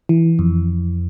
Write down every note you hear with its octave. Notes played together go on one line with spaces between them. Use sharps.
E3
F2